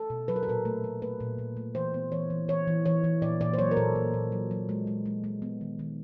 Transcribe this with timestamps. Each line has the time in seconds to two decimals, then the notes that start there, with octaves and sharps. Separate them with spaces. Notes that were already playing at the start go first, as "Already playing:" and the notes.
Already playing: A4
0.10 B2
0.28 F#3 B4
0.36 A#4
0.43 A4
0.48 A#2 A#4
0.65 A3
0.84 A3
1.02 A3 B4
1.20 A#2
1.39 A#2
1.57 A3
1.75 E3 C5
1.94 B3
2.12 E3 C#5
2.30 E3
2.48 E3 C#5
2.68 E3
2.86 E3 C#5
3.04 E3
3.22 A#2 D5
3.41 A#2 D5
3.54 C5
3.58 F#3 C#5
3.71 A#4
3.77 A#2 A4
3.95 A#2
4.13 A#2
4.32 F#3
4.51 F#3
4.69 G#3
4.87 G#3
5.06 G#3
5.24 G#3
5.42 B3
5.61 D#3
5.79 D#3